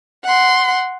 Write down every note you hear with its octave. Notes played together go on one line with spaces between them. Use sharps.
F#5 C6